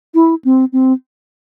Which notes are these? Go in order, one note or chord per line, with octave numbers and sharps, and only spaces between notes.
E4
C4
C4